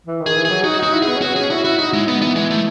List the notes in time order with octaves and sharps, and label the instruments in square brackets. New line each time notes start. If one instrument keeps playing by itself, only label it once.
[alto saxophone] E3
D#3
[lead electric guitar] G#4
[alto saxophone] E3
[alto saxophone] F#3 [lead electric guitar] G#4
[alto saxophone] D#4 [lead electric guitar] F#4
[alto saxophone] D#4 [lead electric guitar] F#4
[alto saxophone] E4
[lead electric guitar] G#4
[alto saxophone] B3
C#4
[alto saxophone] B3 [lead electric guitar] F#4
[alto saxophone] C#4 [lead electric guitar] G#4
[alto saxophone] E4 [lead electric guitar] F#4
[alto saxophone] E4 [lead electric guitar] F#4
[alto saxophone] D#4 [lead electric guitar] F#4
[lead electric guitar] G#3 [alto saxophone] E4
[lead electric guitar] B3 [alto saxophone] D#4
[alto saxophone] E3 [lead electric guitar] B3
[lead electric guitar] G#3
A3